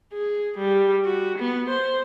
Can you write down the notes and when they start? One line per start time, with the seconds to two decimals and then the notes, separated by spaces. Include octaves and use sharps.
0.13 G#4
0.58 G3
1.05 F#4
1.39 B3
1.70 C5